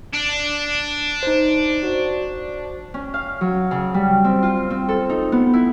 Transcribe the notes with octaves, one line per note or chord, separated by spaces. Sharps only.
D4
D#4 C5
F#4 C5 D5
C#4
F5
F#3
C#3
G3
C4
F4
C4
A4
D#4
B3
E4